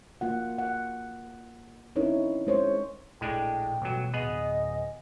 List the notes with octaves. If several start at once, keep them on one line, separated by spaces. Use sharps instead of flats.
A#3 F4 F#5
F#5
C4 C#4 D#4 E4 A#4 C#5
G#3 C5 C#5
A#1 A2 G#3 D4 G5
A1 B2 E3 F#3 G3
D1 B3 G#4 B4 D#5